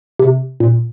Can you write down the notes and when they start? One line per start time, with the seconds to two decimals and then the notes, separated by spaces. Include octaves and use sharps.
0.19 C3
0.60 A#2